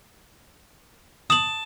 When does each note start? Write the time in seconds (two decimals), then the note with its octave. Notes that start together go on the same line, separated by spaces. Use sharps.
1.30 A5 D#6 F#7